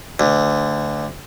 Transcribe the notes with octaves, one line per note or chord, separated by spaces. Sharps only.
D2